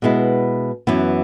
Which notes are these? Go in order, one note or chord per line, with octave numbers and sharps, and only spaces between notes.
B2 G#3 B3 E4
F#2 E3 B3